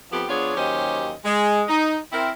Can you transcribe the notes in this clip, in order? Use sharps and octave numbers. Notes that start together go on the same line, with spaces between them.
F2 B3 G4
F3 B3 D4 F4 G#4 C#5
D#2 F#3 C#4 G4 C5 D#5
G#3
D#4
C4 E4 A#4